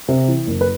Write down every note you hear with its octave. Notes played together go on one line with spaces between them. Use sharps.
C3
E3
F#1
B4